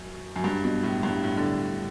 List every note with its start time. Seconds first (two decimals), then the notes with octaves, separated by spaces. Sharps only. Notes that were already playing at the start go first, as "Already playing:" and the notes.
Already playing: F#2
0.36 F#2
0.44 G2
0.64 B2
0.83 A2
1.03 G2
1.23 A2
1.37 D3